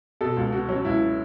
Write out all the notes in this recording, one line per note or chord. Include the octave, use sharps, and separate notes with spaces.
B2 A4
C#2
B2 F#4
F#3 C#4
C#2 E4